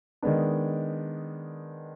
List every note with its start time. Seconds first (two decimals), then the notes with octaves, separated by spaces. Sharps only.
0.22 D#3 G#3 B3 D4